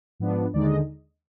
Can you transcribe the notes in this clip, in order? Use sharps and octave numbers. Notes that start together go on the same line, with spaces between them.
G#2 F3 B3 D4
D#2 D3 G#3 D#4 D5
D#5